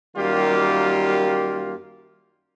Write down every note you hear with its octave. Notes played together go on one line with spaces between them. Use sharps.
F#2 D#3 G3 A#3 F4 G4